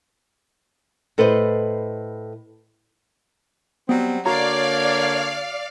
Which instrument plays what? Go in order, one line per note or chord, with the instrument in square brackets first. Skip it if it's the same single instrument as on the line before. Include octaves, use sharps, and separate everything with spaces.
[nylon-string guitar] A2 A4 B4 C5 D#5
[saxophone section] F#3 G3 C4 [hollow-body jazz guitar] B3
[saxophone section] D3 A#3 C#5 [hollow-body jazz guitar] F#4 A#5 [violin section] D5 F5